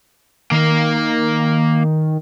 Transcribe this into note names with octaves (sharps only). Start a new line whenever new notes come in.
D#3 A#3 F5